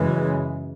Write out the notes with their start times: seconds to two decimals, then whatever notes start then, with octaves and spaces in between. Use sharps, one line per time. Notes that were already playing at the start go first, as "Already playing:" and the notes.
Already playing: F#2 C#3 E3 G#3